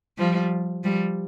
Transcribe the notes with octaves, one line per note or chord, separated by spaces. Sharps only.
F3 G3
F3 G3